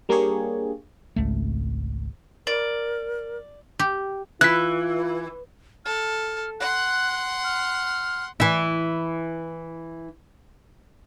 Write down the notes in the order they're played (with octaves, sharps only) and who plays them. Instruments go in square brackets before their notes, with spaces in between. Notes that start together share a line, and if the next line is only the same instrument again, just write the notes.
[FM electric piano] G3 A#3 D4 G4 G#4 C#5
[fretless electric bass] G#1 C#2 A3
[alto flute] A#4 [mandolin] D5
[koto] G4
[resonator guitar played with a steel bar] E3 [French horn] F4 [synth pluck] F#6 B6
[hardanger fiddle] A4 [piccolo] F6
[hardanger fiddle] F#5 C6 [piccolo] F#6
[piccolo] F6
[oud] E3 E4